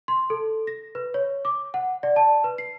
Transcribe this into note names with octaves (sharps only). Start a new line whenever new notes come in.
C6
A4
A#6
B4
C#5
D6
F#5
D5
A5
B4
C7